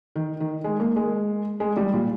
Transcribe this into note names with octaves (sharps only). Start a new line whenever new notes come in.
D#3
D#3
G#3
A#3
G#3
G#3
G3
A#2